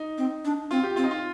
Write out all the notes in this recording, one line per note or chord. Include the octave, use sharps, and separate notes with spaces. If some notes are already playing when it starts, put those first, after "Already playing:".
Already playing: D#4
C4
D4
C4 F4
G4
C4 F4
D#4
F4